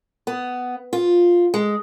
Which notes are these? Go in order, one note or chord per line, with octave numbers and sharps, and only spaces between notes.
B3
F4
G#3